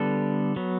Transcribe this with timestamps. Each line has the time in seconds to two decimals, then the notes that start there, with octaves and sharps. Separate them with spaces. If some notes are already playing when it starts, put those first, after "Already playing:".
Already playing: D3 G3 B3 A4
0.56 F#3 B3